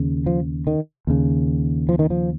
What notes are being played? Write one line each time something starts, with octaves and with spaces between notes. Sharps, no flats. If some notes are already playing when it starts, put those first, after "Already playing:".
Already playing: D#2 C#3
F3
D#3
D#2 C#3
F3
D#3
F3